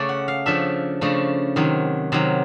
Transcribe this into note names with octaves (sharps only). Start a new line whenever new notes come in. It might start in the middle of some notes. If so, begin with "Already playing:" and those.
Already playing: C#3 A3 C#4 D5
F#5
F5
C#3 F3 A3 D4 E5
C#3 F3 A3 D4
C3 D#3 F#3
C3 D#3 F#3